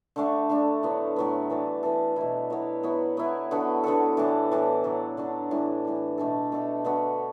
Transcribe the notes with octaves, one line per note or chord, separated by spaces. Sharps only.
D3 A3 D4
D3 A3 D4
A2 F#3 B3
A2 F#3 B3
E3 B3 D4 A4
E3 B3 D4 A4
B2 F#3 B3 E4
B2 F#3 B3 E4
F#3 B3 E4
F#3 B3 E4
D3 B3 F#4 A4
D3 B3 F#4 A4
A2 E3 D4
A2 E3 D4
D3 F#3 D4
D3 F#3 D4
A2 E3 D4
A2 E3 D4
B2 A3 D4 A4
B2 A3 D4 A4
D3 B3 F#4 A4